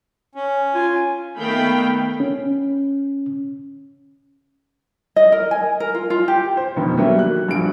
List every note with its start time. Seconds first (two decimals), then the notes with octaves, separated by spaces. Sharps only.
0.35 C#4
0.75 F4 G#5
1.39 D#3 A3 B3 F5 G5 B5
2.20 C#4
5.16 D#5
5.32 A#4
5.51 G#5
5.80 A#4
5.94 F4
6.10 F4
6.28 G4
6.57 C5
6.76 F1 B2 D#3
6.97 F#3 G3 A3 A#3 F#4
7.19 F#6
7.48 A#1 G2 F#4 D7